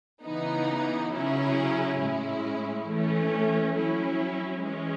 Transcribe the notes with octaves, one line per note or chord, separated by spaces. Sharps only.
C#3 E3 B3 D#4
C#3 F#3 C#4 E4 G#4
A2 G#3 C#4 E4
E3 A3 C#4
F#3 C#4 E4
E3 G#3 C#4